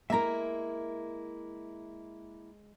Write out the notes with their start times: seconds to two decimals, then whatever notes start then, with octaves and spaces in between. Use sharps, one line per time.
0.10 G#3 A#3 E4 A#4 E5 A#5